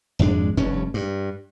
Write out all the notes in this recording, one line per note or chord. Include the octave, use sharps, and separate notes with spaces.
G#1 F2 G#3 D4
F1 G2 C#4
G2